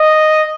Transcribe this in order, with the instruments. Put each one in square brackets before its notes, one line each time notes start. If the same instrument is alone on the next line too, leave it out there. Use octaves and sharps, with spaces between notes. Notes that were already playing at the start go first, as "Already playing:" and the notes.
Already playing: [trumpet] D#5